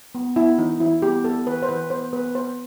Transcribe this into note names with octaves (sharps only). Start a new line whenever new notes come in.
B3
B3 E4
E3 D#4
E3 E4
B3 G4
B3 A4
E3 B4
C5
E3 B4
B3 C5
B3 B4
B3 C5